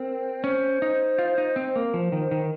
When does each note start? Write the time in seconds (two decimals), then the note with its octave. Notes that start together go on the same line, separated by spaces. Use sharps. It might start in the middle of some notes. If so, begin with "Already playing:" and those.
Already playing: C4 A#4
0.44 C#4 C5
0.82 D#4
1.18 F4
1.38 D#4
1.56 C4
1.76 A#3
1.94 F3 C5
2.12 D#3
2.19 C5
2.31 D#3